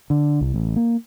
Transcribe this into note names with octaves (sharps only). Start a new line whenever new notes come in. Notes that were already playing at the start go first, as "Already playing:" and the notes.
D3
C2
A1
A#3